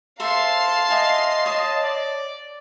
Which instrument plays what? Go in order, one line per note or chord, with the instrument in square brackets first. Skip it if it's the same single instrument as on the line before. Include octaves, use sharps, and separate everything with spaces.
[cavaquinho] A4 C5 E5 [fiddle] F5 C6 [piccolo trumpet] A5
[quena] D#5 [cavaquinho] E5 G#5
[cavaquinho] C#5 [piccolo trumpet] A5
[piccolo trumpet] D5